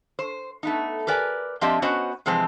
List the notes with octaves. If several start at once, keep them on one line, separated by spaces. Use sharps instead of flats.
C5
A3 B3 D#4
G4 A#4 B4 D5 G#5
F3 C4 D4 G4 D#5 E5
B3 C#4 F#4 C5 D#5
C3 E3 F3 G#3 C4